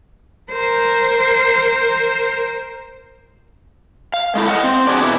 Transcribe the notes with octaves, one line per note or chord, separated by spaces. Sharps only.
A#4 C5
F5
G#3 A3 E4 G#4 A4
D#5 F5 F#5
C4
D4 F#4 G#4 D5
B2 E4